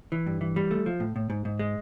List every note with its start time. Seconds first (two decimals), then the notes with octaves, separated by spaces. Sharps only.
0.12 E3
0.26 G2
0.41 E3
0.56 G3
0.71 A3
0.86 F3
1.00 A2
1.16 A2
1.30 G#2
1.45 G#2
1.59 G#3